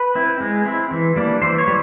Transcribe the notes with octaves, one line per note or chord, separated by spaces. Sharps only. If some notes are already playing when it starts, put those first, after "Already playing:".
Already playing: B4
C4 E4
G#3
C4 E4
E3
G3 A#3 D4
E3 C5
C#5
G3